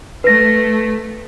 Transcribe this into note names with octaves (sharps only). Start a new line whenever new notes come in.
A3 B4 A#6